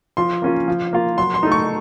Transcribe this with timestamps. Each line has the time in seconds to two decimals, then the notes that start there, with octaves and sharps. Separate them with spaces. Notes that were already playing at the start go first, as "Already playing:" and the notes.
0.17 F3 C6
0.42 A#3 C#4 F4
0.68 F3
0.93 A#3 F4
1.18 F#3 C6
1.34 C6
1.43 A3 D#4
1.52 C#6